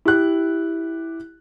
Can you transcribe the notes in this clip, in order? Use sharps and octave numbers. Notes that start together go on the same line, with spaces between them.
E4 G4 F#6